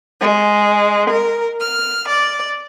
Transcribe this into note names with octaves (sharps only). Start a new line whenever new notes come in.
G#3
A#4
F6
D5